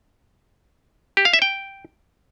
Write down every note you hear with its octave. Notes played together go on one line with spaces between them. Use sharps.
G4
F5
E5
G5